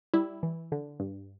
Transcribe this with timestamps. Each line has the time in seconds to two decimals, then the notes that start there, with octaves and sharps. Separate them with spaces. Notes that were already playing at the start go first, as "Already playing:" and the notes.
0.14 G3 E4
0.43 E3
0.72 D3
1.00 G2